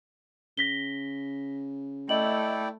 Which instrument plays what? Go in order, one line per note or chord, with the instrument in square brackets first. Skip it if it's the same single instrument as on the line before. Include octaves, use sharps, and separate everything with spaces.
[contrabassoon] C#3 [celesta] A#6 B6 G7
[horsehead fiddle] A3 [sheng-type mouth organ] E4 D5 G5 [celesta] D#5 F#7